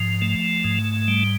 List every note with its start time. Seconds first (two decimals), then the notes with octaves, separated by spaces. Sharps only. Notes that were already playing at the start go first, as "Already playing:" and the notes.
Already playing: G#2 F3
0.22 A3
0.64 G#2
1.08 G3